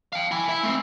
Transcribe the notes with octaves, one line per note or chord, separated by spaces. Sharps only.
F5 G5
E4 G#5
E4
A3 C4